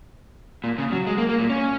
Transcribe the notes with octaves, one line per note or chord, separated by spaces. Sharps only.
A#2
C#3
F#3
G#3
A#3
A#3
A#2
C#4